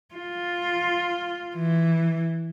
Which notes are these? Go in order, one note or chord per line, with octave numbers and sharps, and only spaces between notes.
F4
E3